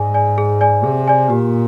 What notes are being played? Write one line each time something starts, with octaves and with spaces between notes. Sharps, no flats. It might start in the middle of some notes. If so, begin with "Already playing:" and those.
Already playing: G#2 G#4 D5 G#5
D5 G#5
G#4
D5 G#5
C3 G#4
D5 G#5
A#2 G4